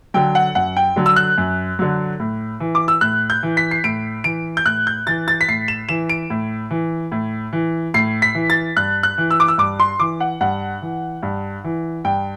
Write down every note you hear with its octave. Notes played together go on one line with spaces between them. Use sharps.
D3 F#3 G5
F#5
F#2 F#5
G5
D3 F#3
E6
F#6
F#2
D3 F#3
A2
E3
D6
E6
A2 F#6
G6
E3
B6
C7
A2 D7
E3 D7
G6
A2 F#6
G6
E3 A6
A6
B6
A2 C7
E7
E3 E7
D7
A2
E3
A2
E3
A2 C7
B6
E3
A6
G2 F#6
F#6
E3
E6
D6
E6
G2 D6
C6
E3 D6
F#5
G2 F#5
E3
G2
E3
G2 G5